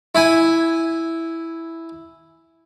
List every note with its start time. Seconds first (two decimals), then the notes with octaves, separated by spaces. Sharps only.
0.15 E4 G#5